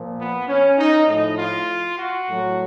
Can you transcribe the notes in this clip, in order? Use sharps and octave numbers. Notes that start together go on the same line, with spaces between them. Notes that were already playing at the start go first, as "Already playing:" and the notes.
Already playing: A#2 F3
B3
C#4
D#4
A2 F3 D#4
F4
F#4
A2 F#3